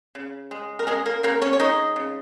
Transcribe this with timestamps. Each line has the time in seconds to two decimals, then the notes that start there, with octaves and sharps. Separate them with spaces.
0.15 C#3
0.51 G#3
0.79 A#4
0.87 G#3 C#4 G#4
1.06 A#3 A#4
1.23 C#3 A#3 A#4
1.42 C#4 C#5
1.53 C#5
1.60 G#3 D#4 D#5
1.96 C#3